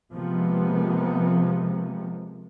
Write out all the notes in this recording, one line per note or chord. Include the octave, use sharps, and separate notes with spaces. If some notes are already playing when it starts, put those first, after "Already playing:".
C3 F3 G#3 A#3 B3